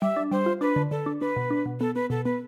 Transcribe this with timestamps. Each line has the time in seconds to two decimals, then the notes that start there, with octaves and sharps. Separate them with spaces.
0.02 G3 E5
0.16 D4
0.31 G3 C5
0.46 F4
0.61 D4 B4
0.76 D3
0.91 D3 A4
1.06 D4
1.21 D4 B4
1.36 B2
1.51 D4
1.66 B2
1.80 B3 A4
1.95 B3 B4
2.10 B2 A4
2.25 B3 B4